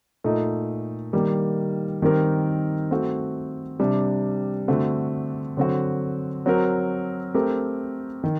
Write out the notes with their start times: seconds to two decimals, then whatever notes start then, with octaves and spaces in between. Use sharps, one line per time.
0.24 A#2 A3 D#4
1.13 D#3 G3 A#3
2.02 D#3 G3 C4 G4 A#4
2.91 A3 C4 F#4
3.80 C3 G3 D4
4.68 D3 A3 C4 F#4
5.57 D3 F#3 C4 F#4
6.46 F#3 C4 F#4 A#4
7.34 A3 C4 G4 A#4
8.24 D#3